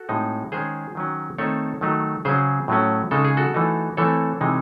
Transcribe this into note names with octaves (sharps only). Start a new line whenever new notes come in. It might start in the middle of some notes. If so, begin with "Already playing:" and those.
Already playing: F#4 A4
A2 G#3 C4 D#4
D#3 G#3 C#4 G#4 C5
D#3 F#3 C#4
D#3 A3 C4 D#4 A4 C#5
D#3 F#3 A3 D#4
C#3 F#3 C#4 G#4 C5
A2 F#3 A3 C#4
C#3 G#3 D#4 A4
G#4
F#4 A4
E3 A3 D#4
E3 A3 C4 A4 C#5
C3 E3 G#3 D#4